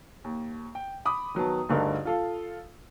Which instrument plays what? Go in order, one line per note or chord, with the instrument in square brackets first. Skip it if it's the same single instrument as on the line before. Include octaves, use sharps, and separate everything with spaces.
[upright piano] D#2
G5
B5 D6 D#6
D#3 F#3 B3 A5
D2 G2 D3 D#4 A4 A#4
F4 A4 F5